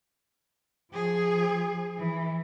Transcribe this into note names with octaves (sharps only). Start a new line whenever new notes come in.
F3 G#4
E3